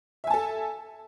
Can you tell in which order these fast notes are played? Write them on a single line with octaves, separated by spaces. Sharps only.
E5 G#5 A5 A4